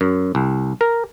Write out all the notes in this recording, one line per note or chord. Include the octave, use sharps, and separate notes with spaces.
F#2
C2
A#4